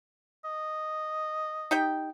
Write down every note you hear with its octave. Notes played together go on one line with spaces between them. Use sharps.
D#5
D#4 G4 G5